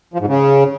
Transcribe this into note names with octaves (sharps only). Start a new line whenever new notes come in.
F3
G#2
C#3